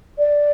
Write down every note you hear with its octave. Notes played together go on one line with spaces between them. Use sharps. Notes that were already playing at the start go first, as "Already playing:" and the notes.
D5